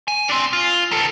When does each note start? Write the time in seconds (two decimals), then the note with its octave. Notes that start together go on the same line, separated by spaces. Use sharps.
0.08 G#5
0.28 C4 D4
0.53 F4
0.91 D#3 A4